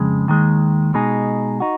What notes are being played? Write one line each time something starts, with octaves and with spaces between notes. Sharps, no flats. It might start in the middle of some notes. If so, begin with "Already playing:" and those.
Already playing: F2 C#3 G#3
D#2 D#3 G#3
B2 G#3 D#4 G#4
D#4 F#4